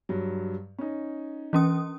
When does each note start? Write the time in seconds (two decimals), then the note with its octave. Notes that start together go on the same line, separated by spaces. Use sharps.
0.09 G2 F#3
0.79 C#4 D#4
1.53 E3 C#4 D#6